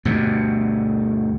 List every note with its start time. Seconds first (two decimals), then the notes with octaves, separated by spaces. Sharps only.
0.05 D2 G2 B2